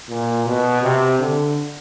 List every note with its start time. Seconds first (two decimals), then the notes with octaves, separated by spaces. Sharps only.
0.09 A#2
0.46 B2
0.82 C3
1.19 D3